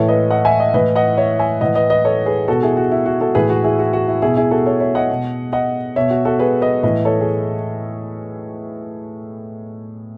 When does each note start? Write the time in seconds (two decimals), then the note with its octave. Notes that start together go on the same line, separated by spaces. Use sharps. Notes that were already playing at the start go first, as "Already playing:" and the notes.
Already playing: A2 E3 A4 C#5
0.08 B4 D#5
0.31 D#5 F#5
0.45 E5 G#5
0.60 D#5 F#5
0.74 A2 E3 B4 D#5
0.96 D#5 F#5
1.18 C#5 E5
1.39 E5 G#5
1.61 A2 E3 D#5 F#5
1.75 B4 D#5
1.90 B4 D#5
2.05 A4 C#5
2.26 G#4 B4
2.48 B2 F#4 A4
2.63 E4 G#4
2.77 F#4
2.92 E4
3.06 F#4
3.20 F#4 A4
3.35 A2 E3 G#4 B4
3.50 F#4
3.64 E4 G#4
3.79 F#4
3.93 F#4
4.08 E4
4.22 B2 E4 G#4
4.37 E4 G#4
4.51 F#4 A4
4.66 A4 C#5
4.80 C#5 E5
4.95 D#5 F#5
5.10 B2
5.53 D#5 F#5
5.96 B2 C#5 E5
6.10 F#4
6.25 F#4 A4
6.39 G#4 B4
6.61 B4 D#5
6.83 A2 E3 B4 D#5
7.05 A4 C#5
7.21 G#4